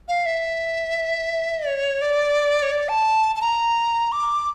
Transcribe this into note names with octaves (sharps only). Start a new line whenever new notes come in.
F5
E5
C#5
D5
C#5
D5
A5
A5
A#5
D6